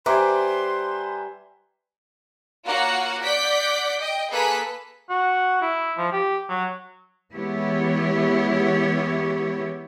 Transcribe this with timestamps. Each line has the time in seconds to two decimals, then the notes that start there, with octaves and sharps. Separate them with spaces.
0.06 G3 B4 C5 E5 G#5 A#5 C6 D6
2.66 A#3 F4 F#4 C#5 F5 F#5
3.23 D5 F#5 G6 B6 D7
4.00 D#5 G5
4.31 A#3 G#4 A4 B4 F#6 B6
5.10 F#4
5.62 E4
5.98 F3
6.13 G4
6.49 F#3
7.33 E3 G#3 B3 E4 G4 C#5